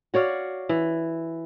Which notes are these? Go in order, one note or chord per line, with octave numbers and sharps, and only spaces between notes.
F#4 C#5 D5 F5
E3